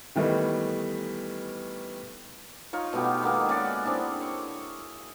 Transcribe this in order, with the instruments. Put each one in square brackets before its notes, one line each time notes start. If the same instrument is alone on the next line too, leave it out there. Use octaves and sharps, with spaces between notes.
[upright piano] D#3 E3 G3 A3 B3 D#4
[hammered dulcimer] D#4 F4 C#5
B2 A3 B3 G4
D#3 G#3 A#3 B3
C#4 D5 F#5
C4 D4 E4 G#4
C#5